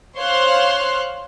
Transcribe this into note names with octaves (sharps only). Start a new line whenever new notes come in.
C5 C#5 F5 C6 F6 F#6